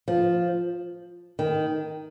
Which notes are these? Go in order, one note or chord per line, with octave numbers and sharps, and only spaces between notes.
F3
D#3